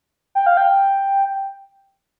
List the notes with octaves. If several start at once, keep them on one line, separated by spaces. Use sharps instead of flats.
G5
F5
G5